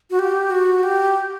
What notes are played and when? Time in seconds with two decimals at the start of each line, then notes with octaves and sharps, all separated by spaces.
0.10 F#4
0.19 G4
0.51 F#4
0.83 G4